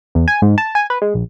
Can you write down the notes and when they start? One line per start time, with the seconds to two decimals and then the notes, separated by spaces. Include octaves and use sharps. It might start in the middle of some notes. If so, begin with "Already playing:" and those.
0.15 E2
0.28 G#5
0.42 G#2
0.58 A5
0.75 G#5
0.90 B4
1.02 G#3
1.14 A#1